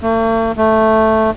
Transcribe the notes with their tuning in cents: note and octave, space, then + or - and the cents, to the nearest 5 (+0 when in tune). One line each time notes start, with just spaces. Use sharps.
A3 +45
A3 +0